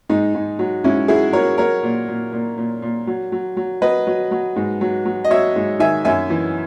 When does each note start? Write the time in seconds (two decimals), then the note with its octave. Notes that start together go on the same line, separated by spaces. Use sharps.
0.10 G#2 D#4
0.34 G#2
0.59 F#3
0.84 G#2 C#4 E4
1.08 F#3 E4 G#4
1.33 F#3 A#4 C#5
1.58 F#3 A#4 C#5
1.83 A#2
2.08 A#2
2.33 A#2
2.58 A#2
2.82 A#2
3.07 F#3
3.32 F#3
3.57 F#3
3.81 F#3 B4 D#5
4.07 F#3
4.31 F#3
4.56 G#2
4.81 F#3
5.05 F#3
5.24 D#5
5.30 F#3 C#5 E5
5.56 G#2
5.80 D#3 E5 G#5
6.05 F#2 E5 G#5
6.30 E3